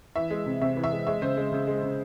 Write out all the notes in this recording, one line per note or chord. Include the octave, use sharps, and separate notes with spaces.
E3 E5
G#3
C3
C3 E5
E3
E5
G#3
G#3 E5
C#3 C5
G#3
C#3
G#3
C#3